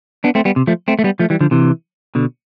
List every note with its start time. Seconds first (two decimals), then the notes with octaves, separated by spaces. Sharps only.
0.24 B3 D4
0.35 A3 C4
0.45 G3 B3
0.56 C3
0.67 F3 A3
0.88 A3 C4
0.99 A3
1.04 G3 B3
1.20 F3 A3
1.30 E3 G3
1.41 D3 F3
1.51 C3 E3
2.15 B2 D3